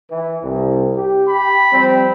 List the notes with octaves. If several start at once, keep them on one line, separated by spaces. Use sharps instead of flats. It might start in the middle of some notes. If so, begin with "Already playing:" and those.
E3
C2
G4
B5
F3 G3 C4